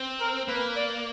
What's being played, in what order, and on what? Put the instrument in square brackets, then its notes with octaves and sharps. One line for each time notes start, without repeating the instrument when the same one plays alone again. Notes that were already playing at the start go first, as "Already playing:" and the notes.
Already playing: [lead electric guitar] C4
[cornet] A#4
[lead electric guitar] A#3 [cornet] B4
[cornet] D5